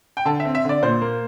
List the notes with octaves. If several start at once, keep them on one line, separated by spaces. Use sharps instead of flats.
G5
D3 A5
E5
C4
E5
D3 D5
A#2 C5
A#3